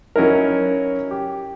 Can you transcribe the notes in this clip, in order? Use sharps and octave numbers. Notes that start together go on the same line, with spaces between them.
F#3 C#4 D#4 E4 A#4
G4